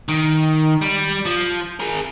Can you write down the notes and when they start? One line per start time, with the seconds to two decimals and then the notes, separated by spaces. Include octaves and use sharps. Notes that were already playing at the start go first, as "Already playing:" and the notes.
0.08 D#3
0.81 G3
1.26 F3
1.80 G#4 A#4